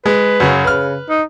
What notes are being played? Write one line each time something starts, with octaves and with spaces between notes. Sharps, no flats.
G#3 B4
F#2 C#3 F#3
C#3 B4 F6
D#4